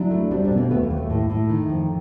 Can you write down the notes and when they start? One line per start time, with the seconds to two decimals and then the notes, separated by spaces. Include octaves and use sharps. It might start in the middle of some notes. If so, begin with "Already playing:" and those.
Already playing: F#3 D4 E4
0.11 A3
0.31 G3 C4 D4
0.44 C4 D4
0.51 B2
0.57 A#3 C4
0.70 D#2 A3 B3
0.83 A#3
0.91 D#2
0.97 A3
1.10 A2
1.30 A2
1.50 D#3
1.69 F2